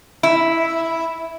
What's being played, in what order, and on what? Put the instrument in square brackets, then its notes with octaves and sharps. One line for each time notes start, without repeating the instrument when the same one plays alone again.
[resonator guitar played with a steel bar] E4